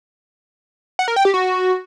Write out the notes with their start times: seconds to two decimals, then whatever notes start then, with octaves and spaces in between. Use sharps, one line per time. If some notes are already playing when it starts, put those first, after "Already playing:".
0.99 F#5
1.08 A#4
1.16 G5
1.25 G4
1.34 F#4